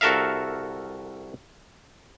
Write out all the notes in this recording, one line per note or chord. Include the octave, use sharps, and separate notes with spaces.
C2 F#4 A4 A#4 E5 F5